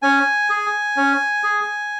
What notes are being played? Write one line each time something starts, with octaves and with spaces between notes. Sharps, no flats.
C#4 G#5
G#4
C#4
G#4